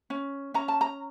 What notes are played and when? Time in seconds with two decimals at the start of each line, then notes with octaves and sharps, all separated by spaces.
0.10 C#4
0.54 C#4 A#5
0.68 A5
0.81 A#5